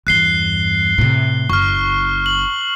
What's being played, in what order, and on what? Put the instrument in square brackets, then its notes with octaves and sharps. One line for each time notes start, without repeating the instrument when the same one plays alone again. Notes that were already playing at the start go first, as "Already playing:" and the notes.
[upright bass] E2 G2 [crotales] F#6 C7 G7
[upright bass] A2 C3
[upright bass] F#1 [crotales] C#6 F6
[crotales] F#7